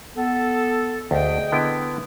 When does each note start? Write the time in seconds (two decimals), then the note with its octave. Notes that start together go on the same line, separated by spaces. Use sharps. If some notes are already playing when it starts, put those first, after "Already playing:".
0.15 B3 A4
1.11 D2 G#4 D#5 G5
1.52 D3 B3 E4